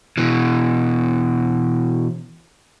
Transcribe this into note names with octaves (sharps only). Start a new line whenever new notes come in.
B2 E3